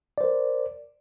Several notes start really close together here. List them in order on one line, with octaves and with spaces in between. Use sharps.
D5 C5 A#4